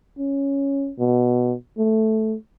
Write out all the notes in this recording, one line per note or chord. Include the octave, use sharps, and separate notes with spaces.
C#4
B2
A3